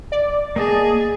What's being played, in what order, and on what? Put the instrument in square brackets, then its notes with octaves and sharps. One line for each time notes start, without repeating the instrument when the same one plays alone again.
[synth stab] D5
[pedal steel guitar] A#3 D#5 A5 [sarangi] G#4